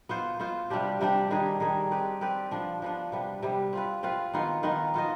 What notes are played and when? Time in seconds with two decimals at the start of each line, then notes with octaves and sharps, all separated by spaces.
0.09 B3 F4 C5
0.40 B3 F4 C5
0.70 C3 G3 D4 G4
1.01 C3 G3 D4 G4
1.30 D#3 G3 D4 G#4
1.60 D#3 G3 D4 G#4
1.91 C4 G4 B4 D5
2.21 C4 G4 B4 D5
2.51 F3 B3 D4
2.82 F3 B3 D4
3.12 C3 G3 B3
3.43 C3 G3 B3
3.73 C4 F4 B4
4.03 C4 F4 B4
4.34 D#3 B3 F4
4.63 D#3 B3 F4
4.94 B3 F4 C5 D#5